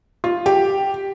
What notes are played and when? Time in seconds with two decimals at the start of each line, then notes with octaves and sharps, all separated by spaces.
0.24 F4
0.46 G4